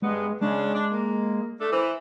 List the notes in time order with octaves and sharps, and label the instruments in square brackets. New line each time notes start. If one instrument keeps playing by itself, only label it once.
[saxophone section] G2 B3 [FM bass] G#3
[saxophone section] C#3 D4 [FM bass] G#3
[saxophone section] D4
A#3
A3 D4 A4
E3 C5